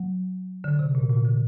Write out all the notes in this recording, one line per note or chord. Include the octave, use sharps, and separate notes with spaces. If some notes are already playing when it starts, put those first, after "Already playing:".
Already playing: F#3
D3
C3
A#2
A#2
D3